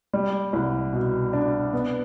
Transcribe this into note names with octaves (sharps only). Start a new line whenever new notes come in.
G3
C2
B2
D4
B3